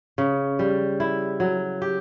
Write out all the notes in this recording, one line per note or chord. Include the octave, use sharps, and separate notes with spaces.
C#3
G3
E4
F#3
G4